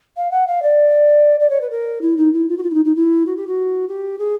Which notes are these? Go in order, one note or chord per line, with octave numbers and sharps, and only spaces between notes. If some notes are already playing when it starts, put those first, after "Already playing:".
F5
F#5
F5
D5
D5
C#5
B4
A#4
E4
D#4
E4
F4
F#4
F4
E4
D#4
D#4
E4
F#4
G4
F#4
G4
G#4